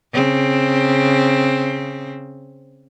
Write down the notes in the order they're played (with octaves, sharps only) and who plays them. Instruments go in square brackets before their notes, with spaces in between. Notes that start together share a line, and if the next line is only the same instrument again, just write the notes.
[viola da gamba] C#3 C4